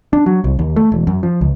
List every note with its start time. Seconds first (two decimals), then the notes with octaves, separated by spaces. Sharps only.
0.13 D4
0.26 F#3
0.44 C2
0.59 D#2
0.76 A3
0.92 E1
1.07 F#2
1.23 F3
1.41 C#2